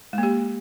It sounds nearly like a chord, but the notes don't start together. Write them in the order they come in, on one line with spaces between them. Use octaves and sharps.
G#3 A#3 G4